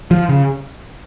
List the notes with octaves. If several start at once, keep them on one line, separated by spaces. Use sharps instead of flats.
F3
C#3